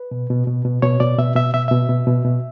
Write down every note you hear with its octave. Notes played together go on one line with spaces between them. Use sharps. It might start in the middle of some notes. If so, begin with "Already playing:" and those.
Already playing: B4
B2
B2
B2
B2
B2 C#5
B2 D5
B2 E5
B2 E5
B2 E5
B2 E5
B2
B2
B2